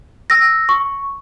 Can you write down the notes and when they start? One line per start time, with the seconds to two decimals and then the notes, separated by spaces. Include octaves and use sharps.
0.30 E6 A#6
0.69 C#6